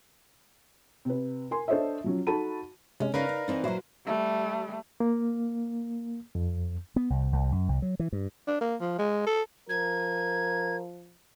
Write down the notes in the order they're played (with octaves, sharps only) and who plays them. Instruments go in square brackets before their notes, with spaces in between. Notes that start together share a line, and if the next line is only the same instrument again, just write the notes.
[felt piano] C3 B4
A#4 G#5 C6
D4 A4 C5 C#5 D#5 E5
F3 F#3 C#4
D#4 F#4 A4 A5 B5 D#7
[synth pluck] C3 G#3 [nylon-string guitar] C#4
[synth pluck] C#3 [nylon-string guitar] C#4 D#4 [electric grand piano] A#4 B4 F5 [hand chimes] D5 A#6
[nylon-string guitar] D#4
[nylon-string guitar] E3 C4 D#4 [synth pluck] A6
[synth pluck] A#2 E4 C#5 [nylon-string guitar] F#3 C5 [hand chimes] F#4
[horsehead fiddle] G3 A3
[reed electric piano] A#3
F2
[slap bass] B3
C2
C2
F#2
C2
F#3
E3
G2
[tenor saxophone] D4
A#3
F3
G#3
A4
[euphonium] F3 [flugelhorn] A#4 [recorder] G#6